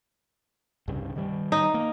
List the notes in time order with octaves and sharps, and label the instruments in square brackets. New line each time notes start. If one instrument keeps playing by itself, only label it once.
[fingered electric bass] C2 G2 C#3
D#3 G3
[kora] D#4
[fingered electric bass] A#3